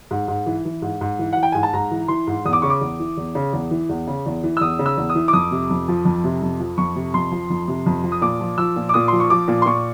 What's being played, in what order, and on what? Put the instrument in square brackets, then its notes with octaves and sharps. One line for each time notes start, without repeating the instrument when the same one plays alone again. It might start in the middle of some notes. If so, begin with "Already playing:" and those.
[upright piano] G#2
G#2
E3
E3
G#2
G#2
E3
E3 F#5
G5
G#2 G#5
A5
G#2 A#5
E3
E3 C6
G#2
E2 D#6
D6
C#3 C#6
D6
E2
E3
E2
C#3
E2
E3
E2
C#3
E2
E3
E6
E2 D#6
C#3
E6
E2
D#6
E3
D6
F2 D#6
C3
F2
F3
F2
C3
F2
F3
F2 C#6
C3
F2 C6
F3
F2
C3
F2
F3
D#6
A#2 D6
F3
F3 E6
A#2
D6
A#2 D#6
F3 C6
C#6
F3 D6
A#2
C6
A#2 C#6